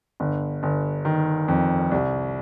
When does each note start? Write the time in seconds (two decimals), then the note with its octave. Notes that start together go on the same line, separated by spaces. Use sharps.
0.20 G1
0.63 G1
1.05 D#3
1.48 F2
1.91 C2